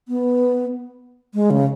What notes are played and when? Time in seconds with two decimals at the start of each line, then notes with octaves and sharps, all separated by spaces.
0.08 B3
1.34 G#3
1.50 C#3